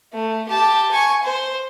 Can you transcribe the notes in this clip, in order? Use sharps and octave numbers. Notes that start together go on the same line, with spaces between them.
A3
G4 A5
G#5 C#6
C5